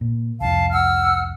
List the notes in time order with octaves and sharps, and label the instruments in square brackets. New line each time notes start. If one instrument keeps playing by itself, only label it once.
[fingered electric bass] A#2
[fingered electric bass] C2 F2 [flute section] F5 A5
[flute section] F#5 E6 F6